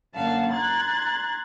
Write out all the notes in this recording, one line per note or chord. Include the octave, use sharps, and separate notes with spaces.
F#2 D3 A#3 F5 F#5 A5
A#5 C6 F#6 G#6 A6